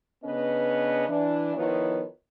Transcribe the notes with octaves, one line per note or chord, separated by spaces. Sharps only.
C#3 B3 C#4 D4 B4 D#5
E3 D4
D#3 F3 B3 E4 F4 C#5